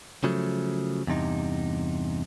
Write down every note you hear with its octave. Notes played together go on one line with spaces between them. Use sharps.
C#3 F3 F#3 A3
E2 G2 C3 D#4